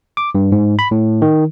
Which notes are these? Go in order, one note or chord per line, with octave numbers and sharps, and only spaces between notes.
D6
G2
G#2
B5
A2
D#3